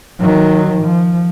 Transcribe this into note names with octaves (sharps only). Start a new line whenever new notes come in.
D#3 F#3
F3